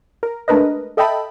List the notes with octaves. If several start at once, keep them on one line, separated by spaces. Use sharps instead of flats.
A#4
G#3 A3 D4 A#4 B4 D#5
A4 D#5 E5 G5 A5 B5